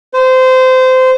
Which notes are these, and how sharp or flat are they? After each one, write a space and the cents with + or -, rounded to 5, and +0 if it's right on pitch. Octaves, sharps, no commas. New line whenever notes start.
C5 -20